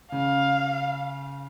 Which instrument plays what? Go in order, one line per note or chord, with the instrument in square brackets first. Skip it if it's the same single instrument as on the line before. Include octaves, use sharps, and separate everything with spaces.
[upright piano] C#3 [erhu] F5